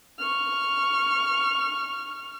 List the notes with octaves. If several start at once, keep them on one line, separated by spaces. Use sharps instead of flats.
C#6 F6